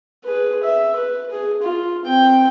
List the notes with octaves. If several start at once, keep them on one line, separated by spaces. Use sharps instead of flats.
G#4 B4
E5
B4
G#4
F4
C4 G5